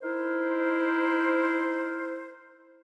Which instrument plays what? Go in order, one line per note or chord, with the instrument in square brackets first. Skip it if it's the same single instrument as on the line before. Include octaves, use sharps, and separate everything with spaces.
[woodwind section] D#4 E4 A#4 C5